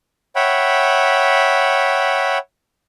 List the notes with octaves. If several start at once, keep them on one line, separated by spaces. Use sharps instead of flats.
C#5 E5 F#5 G5 B5